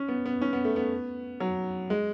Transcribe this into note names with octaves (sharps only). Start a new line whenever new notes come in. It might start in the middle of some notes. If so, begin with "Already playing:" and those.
Already playing: C#4
B3
B3
C#4
B3
A3
B3
F#3
G#3